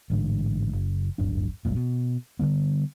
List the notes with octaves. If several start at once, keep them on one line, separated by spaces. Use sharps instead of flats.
A1 G#2 D3
F#1
D1 G1 F#2 D4
F1 B1 G2 A#2
B2
D3 F3 G3 B3